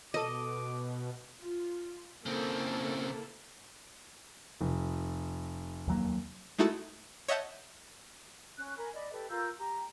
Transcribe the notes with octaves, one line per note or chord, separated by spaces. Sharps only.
B2 A4 D#5 D6 D#7
F4
C#3 A#3 C4 E4 A4
F1
D#2 F#3 A#3
G#3 A3 D#4 E4 F#4 A4
C#5 D#5 E5 F#5 A5 G6
C#4 F#6
A#4 G#5 B5
D5 D#5 B5
G4 A4 B4
F4 A#4 E6 G6
G4 A#5